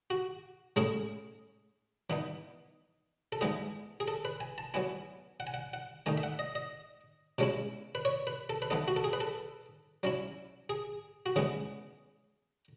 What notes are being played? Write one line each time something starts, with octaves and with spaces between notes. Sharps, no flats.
F#4
A2 G#3 C#4 E4 G#4
E3 B3 D#4
A4
E3 G#3 B3 D#4 G#4
G#4
A4
B4
G#5
A5
F#3 B3 E4 G#5
F#5
G#5
F#5
F#5
D#3 A3 D#4 G#5
E5
F#5
D#5
D#5
B2 G#3 C#4 E4
B4
C#5
B4
A4
B4
E3 B3 D#4 A4
F#4
A4
G#4
B4
A4
F#3 C#4 E4
G#4
F#4
C#3 E3 G#3 B3 G#4